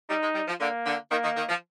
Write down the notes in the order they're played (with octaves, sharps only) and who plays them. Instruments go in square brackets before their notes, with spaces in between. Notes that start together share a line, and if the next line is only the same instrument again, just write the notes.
[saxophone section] G3 [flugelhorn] D#4
[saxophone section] G#3
G3
F3
[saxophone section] D3 [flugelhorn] A#3
[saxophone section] D3
[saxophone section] D#3 [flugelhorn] A#3
[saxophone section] D#3
D#3
F3